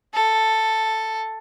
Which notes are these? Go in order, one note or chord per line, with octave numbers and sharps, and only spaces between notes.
A4